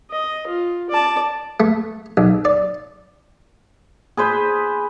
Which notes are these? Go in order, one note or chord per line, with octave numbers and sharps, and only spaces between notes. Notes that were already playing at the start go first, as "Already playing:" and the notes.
D#5
F4
D5 A5
A3
B1
D5
G#4 B4 C5 B5